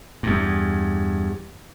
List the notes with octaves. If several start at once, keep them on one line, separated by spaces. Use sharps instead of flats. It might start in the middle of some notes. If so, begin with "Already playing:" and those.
E2 G2